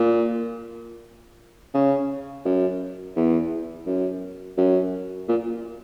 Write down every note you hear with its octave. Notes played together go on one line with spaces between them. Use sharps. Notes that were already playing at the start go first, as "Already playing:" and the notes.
Already playing: A#2
C#3
F#2
E2
F#2
F#2
A#2